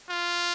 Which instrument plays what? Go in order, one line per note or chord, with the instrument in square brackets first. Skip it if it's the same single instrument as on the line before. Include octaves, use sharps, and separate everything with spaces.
[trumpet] F4